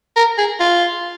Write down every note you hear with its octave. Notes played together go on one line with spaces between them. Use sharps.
A#4
G#4
F4